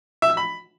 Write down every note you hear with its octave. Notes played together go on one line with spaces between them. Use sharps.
E5
E6
B5